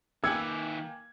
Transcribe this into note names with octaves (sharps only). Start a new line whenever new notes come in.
D#3 A#3 B4 G5 G#5 E6 G#6 C#7